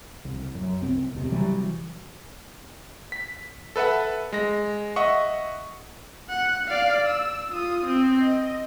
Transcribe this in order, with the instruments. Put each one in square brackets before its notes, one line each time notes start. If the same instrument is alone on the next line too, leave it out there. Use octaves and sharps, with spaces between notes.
[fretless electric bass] C2
F#2
C2 C4
E1 C#2 C3
C3 E3 F#3 G3
[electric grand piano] B6
A4 B4 E5 F#5
G#3 A#6
D#5 E5 F#5 C#6
[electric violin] F#5
D5 F5
E6
F4 D#6
C4
D#5